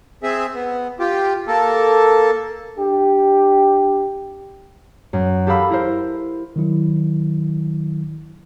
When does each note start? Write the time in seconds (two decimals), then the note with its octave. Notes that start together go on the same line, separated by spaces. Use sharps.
0.23 C4 G#4 E5
0.55 B3
0.99 F4 G4
1.48 A#3 A4
2.77 D4 G4
5.13 F#2
5.47 G4 A4 A#4 F5 B5 E6
5.70 E4 A#4 C5
6.56 D#3 F#3 E4